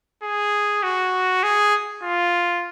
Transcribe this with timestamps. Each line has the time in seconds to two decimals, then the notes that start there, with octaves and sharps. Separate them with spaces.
0.23 G#4
0.83 F#4
1.43 G#4
2.03 F4